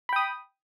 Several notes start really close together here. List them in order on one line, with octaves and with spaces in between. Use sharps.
B5 G5 D#6